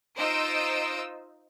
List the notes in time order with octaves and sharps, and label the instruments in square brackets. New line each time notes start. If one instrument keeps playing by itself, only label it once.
[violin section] D#4 F4 C5 D#5 E6 D7